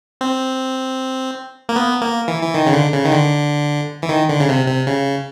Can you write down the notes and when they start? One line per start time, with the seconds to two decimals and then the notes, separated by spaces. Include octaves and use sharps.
0.21 C4
1.69 A#3
1.76 B3
2.02 A#3
2.28 E3
2.42 E3
2.54 D#3
2.67 C#3
2.73 D3
2.92 C#3
3.05 D#3
3.12 D3
4.02 E3
4.09 D#3
4.29 D3
4.40 C#3
4.49 C3
4.68 C3
4.87 C#3